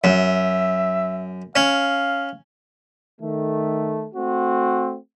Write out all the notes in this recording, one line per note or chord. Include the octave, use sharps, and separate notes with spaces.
F#2 E5
C#4 F5
D#3 A3
A3 C4 F#4